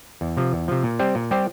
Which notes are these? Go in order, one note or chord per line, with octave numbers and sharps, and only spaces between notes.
E2
C3 F3
E2
C3 F3
A#2
G3 C4 G4 C5
A#2
G3 C4 G4 C5